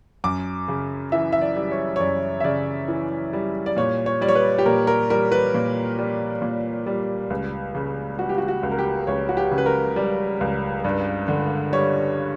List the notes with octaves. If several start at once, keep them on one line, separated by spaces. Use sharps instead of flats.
F#2 D6
C#3
E3 E5
E5
D5
G3
C#5
C#5
F#2 D5
E5
C#3 D5
E3
G3
D5
A#2 C#5
C#5
G3 D5
C#5
B4
G4
A#2 A#4
A#4
G3 A#4
B4
A#2
G3
A#2
G3
C#2
C#3
G3 F#4
G4
F#4
F#4
C#2
A#4
G4
C#2 C#5
F#4
G4
C#3
B4
A#4
G3
C#2
G2
D3
G3 C#5